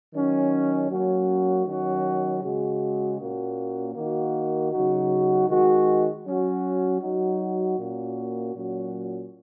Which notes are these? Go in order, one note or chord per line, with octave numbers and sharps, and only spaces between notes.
D#3 F#3 C#4
F#3 A#3 C#4 F#4
D#3 F#3 C#4 F#4
C#3 G#3 F#4
A#2 A#3 C#4 F#4
D#3 A#3 F#4
C#3 F#3 D#4 F#4
D#3 G#3 F#4
F#3 C#4 F#4
F#3 D#4 F#4
A#2 A#3 C#4 F#4
A#2 F#3 C#4 F#4